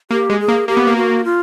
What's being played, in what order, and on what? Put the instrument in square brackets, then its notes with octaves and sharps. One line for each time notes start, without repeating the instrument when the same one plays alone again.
[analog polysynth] A#3 [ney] G4
[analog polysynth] G#3
[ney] G#4
[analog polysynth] A#3
[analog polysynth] A#3 [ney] G4
[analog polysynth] B3
A#3
[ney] F#4
F4